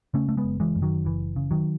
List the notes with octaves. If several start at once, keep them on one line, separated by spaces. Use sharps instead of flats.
C#3 A3 C#4
A3
G#3 B3
F#1
E3 G#3
F#2
D#3 F#3
F#1 E3
C#3
D#3 F#3